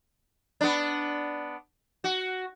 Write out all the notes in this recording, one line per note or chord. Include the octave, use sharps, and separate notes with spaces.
B3 D4
F#4